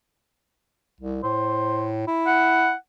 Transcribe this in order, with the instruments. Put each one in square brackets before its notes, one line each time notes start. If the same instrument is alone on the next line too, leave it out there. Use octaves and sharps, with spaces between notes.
[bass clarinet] C2
[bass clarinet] A2 [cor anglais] C5
[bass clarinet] E4
[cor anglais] F#5